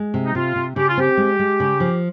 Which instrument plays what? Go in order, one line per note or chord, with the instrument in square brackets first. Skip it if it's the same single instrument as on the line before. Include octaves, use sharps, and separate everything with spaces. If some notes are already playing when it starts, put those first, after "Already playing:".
Already playing: [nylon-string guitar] G#3
C3
[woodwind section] D#4
[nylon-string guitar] C3 [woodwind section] F4
[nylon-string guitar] C3
[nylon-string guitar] C#3 [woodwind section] G4
[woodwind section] F4
[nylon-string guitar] C4 [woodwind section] G4
[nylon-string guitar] G#3
G#3
C#3
F3